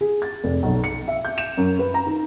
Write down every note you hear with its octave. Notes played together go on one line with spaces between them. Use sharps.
G#4
A6
F1
B1
C#7
E5
G6
E7
F#2
B4
A#5
D#4